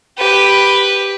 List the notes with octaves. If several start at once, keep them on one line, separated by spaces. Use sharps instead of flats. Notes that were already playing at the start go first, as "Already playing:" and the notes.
G4 B4